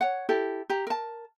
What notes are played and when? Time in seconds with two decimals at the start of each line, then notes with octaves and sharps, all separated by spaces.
0.01 C#5 F#5
0.29 E4 G4 A4
0.70 G4 A#5
0.87 A#4 A5